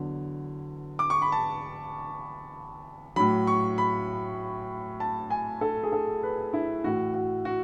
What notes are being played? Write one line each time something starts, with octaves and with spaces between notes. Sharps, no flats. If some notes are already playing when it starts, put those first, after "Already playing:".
Already playing: E2 D3 F#3
D6
C#6
B5
A5
A2 F#3 B5
C#6
B5
A5
G#5
A4
G#4
A4
B4
E4
A2 E3 F#4
F#4
F#4